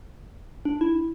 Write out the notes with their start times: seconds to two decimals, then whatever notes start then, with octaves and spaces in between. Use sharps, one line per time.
0.65 D4
0.81 E4